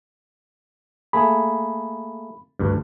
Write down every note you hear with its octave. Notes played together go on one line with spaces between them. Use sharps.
A3 A#3 G#4 B5
D2 G2